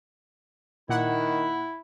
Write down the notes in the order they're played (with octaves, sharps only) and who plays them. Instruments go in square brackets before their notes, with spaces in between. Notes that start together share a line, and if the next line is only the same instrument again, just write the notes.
[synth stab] A#2 F#5 [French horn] D#3 [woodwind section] E4